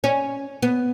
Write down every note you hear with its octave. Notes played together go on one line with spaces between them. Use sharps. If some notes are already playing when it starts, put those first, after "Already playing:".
C#4
B3